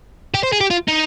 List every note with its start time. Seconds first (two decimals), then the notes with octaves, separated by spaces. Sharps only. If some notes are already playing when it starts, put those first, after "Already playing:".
0.34 G4
0.43 C5
0.52 G#4
0.60 G4
0.70 F4
0.88 D#4